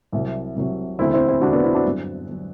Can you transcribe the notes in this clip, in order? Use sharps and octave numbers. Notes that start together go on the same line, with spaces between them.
C2 C3 F#3
C2 C3 F#3
E1 D2 D3 C4 E4
C4 E4
C4 E4
E1 D2 D3 D4 F#4
B3 D4
C4 E4
D4 F#4
G1 G2 F#3
G1 F#3